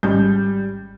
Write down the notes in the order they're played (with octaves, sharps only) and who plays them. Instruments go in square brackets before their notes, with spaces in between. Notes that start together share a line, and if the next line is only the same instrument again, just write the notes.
[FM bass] G#1 [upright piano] G3 G6 [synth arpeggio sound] G#3 C#4